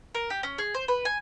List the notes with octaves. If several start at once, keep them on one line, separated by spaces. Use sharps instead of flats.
A#4
G4
C#4
G#4
C5
B4
G#5